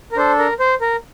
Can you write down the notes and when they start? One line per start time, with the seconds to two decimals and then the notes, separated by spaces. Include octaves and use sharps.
0.12 A#4
0.17 D4 A4 C5
0.39 A#4
0.60 C5
0.81 A#4